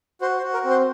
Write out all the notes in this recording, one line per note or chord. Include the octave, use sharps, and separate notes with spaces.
F#4 C5
C5
F#4
A#4
C4
C5